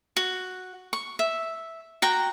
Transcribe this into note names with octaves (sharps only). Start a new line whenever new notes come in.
F#4
C#6
E5
F#4 G5 A#5